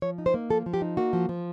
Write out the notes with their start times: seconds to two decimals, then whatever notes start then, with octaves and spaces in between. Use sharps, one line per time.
0.02 F3 C#5
0.18 D#4
0.26 C5
0.34 A#3
0.50 F3 A4
0.66 F3
0.74 G4
0.82 D#4
0.97 A#3 F#4
1.13 F3
1.29 F3